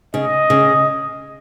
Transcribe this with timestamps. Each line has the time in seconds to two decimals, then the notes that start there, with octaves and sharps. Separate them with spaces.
0.14 C#3 D#5
0.50 C#3